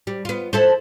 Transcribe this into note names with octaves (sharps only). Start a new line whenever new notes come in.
G3
B3 F4
E4 A4 C5